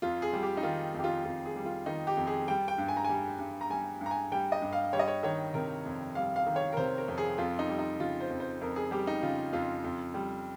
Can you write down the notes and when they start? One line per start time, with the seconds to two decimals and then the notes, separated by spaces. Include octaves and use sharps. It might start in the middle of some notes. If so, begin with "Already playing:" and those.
0.02 F2 F4
0.22 G#4
0.33 G3
0.42 G4
0.57 D#4
0.63 D#3 F4
0.94 F2 G4
1.04 F4
1.24 F2 F4
1.45 G#4
1.56 G3
1.65 F4
1.86 D#3 D#4
2.07 G4
2.17 F2
2.27 G#4
2.48 G3 G5
2.68 G5
2.78 G2
2.88 G#5
2.97 A#5
3.04 G3 G#5
3.39 G2
3.61 A#5
3.70 G3 G#5
4.01 G2
4.06 A#5
4.11 G#5
4.32 G3 G5
4.52 D#5
4.62 G2
4.73 F5
4.93 G3 C#5
4.99 D#5
5.07 C#5
5.23 D#3 C#5
5.54 C3 A#4
5.85 F2
6.15 G3 F5
6.36 F5
6.46 D#3
6.56 C#5
6.73 A#4
6.77 C3 C5
6.98 A#4
7.08 F2
7.18 G#4
7.38 F2 F4
7.59 D#4
7.69 G3
7.79 D#4
8.00 C#3 F4
8.20 C5
8.30 F2
8.40 C5
8.61 F2 A#4
8.76 G#4
8.91 G3 G4
9.07 D#4
9.22 C#3 F4
9.52 F2 F4
9.84 F2
10.14 G3